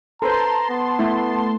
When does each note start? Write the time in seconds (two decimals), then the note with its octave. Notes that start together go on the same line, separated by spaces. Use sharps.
0.22 A4 B4 C5 A5 A#5 C6
0.70 B3
0.99 A3 E4